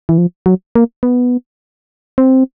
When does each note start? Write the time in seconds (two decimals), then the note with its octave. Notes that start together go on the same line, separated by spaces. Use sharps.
0.09 E3
0.18 F3
0.46 F#3
0.76 A#3
1.03 B3
2.18 C4